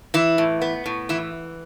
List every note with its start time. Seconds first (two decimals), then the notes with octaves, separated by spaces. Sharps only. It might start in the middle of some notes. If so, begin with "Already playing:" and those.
0.14 E3 E4
0.38 A2
0.62 B3
0.86 A2
1.09 E3 E4